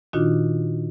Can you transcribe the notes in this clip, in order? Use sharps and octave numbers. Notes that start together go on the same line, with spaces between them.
A#2 D#3 D4 D#4 F4 F#4